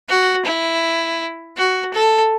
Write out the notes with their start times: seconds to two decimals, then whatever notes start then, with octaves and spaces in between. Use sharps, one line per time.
0.09 F#4
0.45 E4
1.58 F#4
1.94 A4